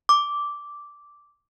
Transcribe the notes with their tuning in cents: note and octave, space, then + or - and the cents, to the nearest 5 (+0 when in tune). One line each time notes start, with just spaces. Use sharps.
D6 -10